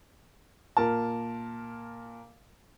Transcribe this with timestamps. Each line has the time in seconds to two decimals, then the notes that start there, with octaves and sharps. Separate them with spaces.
0.77 A#2 A#4 A5